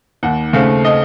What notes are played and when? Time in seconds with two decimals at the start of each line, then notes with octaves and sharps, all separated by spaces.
0.23 D#2 F#5
0.53 C#3 A3 C4 F5
0.85 D#5